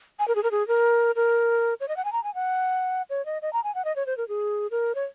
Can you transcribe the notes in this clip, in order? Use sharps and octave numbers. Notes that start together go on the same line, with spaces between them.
G#5
A#4
G#4
A#4
G#4
A#4
A#4
C#5
D#5
F#5
G#5
A#5
G#5
F#5
C#5
D#5
D#5
A#5
G#5
F#5
D#5
C#5
C5
A#4
G#4
A#4
C#5